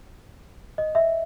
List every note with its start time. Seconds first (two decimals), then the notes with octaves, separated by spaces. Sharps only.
0.78 D#5
0.95 E5